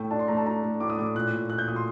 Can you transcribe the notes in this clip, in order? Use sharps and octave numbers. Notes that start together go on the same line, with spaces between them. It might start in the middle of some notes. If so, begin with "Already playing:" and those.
Already playing: A2 A3 G5
D4 A5
C6
A3 A#5
A5
D4 A#5
A3
A2 D6
D#6
A2 D6
A#2 F#6
A#2
A#2 F#6
G6
A#2 D#6
C6